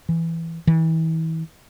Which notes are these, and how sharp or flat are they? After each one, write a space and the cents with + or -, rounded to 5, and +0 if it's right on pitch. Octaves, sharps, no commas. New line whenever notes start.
E3 +5
E3 -35